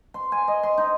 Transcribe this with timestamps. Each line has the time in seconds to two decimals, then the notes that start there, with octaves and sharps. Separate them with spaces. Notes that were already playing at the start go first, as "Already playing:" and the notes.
0.14 C6
0.32 G#5
0.48 D#5
0.63 C6
0.78 D#4